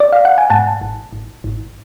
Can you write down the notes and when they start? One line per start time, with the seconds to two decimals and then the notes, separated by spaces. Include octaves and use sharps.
0.00 D5
0.12 F5
0.25 F#5
0.38 G#5
0.50 G#2 F#5 A5
0.81 G#1
1.13 G#1
1.44 G#1